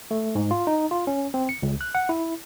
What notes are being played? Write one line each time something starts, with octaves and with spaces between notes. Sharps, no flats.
A3
G#2
F4
D#4
F4
C#4
C4
C#7
C#2
F#6
F#5
E4